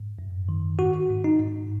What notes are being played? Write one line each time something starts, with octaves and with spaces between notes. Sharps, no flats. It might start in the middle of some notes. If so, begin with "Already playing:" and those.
Already playing: G#2
F#2
D#3
G#2 F#4
G#2
D#4
G#2